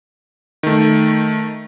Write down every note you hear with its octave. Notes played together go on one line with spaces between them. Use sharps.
D#3 A3